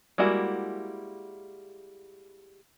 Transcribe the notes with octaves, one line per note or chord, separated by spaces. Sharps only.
G3 G#3 A#3 E4 F#4